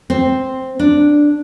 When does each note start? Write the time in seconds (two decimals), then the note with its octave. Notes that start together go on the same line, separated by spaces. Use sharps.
0.10 C4
0.79 D4